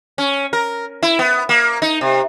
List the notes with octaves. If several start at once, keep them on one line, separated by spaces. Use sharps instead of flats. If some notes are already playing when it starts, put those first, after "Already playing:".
C#4
A#4
E4
B3
A#3
D#4
C3